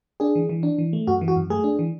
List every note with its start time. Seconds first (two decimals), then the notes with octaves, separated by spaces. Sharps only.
0.20 D4 G#4
0.35 E3
0.49 E3
0.63 D4
0.78 E3
0.93 A3
1.07 F#2 F#4
1.21 E3
1.28 F#4
1.36 F#2
1.50 A3 G#4
1.64 D4
1.79 E3